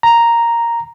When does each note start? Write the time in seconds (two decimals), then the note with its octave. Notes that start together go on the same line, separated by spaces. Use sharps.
0.03 A#5